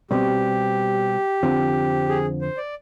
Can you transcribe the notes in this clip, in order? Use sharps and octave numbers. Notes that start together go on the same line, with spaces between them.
B2 G3 C4 G4
F2 D3 F3 C4
G#4
C5
D5